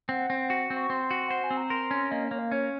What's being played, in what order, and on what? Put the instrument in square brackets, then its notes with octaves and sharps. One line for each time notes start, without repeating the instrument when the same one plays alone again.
[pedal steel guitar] C4 [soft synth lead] F#5
[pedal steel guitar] C4
F#4
C4
[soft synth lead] C#6
[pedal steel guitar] C4 [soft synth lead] C6
[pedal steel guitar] F#4
[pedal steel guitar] C5 [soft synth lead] F#5
[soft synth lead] G#5
[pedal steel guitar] C4
[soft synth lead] A#5
[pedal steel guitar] A#4 [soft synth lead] C6
[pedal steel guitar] C#4
[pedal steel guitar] A#3 [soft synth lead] D#5
[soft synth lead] C#5
[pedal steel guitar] A#3
[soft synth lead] F5
[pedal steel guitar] C#4 [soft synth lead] C#5